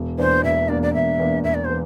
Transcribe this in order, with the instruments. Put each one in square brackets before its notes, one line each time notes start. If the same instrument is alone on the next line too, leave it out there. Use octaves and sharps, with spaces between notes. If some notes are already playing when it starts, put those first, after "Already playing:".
Already playing: [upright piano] E1
[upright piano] E2 E3 A#3 D4 [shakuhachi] C5
[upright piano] E1 [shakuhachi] E5
[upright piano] E2 E3 A#3 D4 [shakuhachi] D5
[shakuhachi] D5
[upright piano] E1 [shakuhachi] E5
[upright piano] E2 E3 A#3 D4
[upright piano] E1 [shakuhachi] E5
[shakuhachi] D5
C5
[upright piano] E3